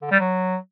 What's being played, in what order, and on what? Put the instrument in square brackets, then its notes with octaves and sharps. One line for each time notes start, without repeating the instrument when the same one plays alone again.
[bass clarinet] D3
G3
F#3